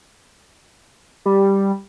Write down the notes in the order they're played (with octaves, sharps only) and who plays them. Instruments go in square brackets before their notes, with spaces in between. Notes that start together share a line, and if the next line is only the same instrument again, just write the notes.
[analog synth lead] G3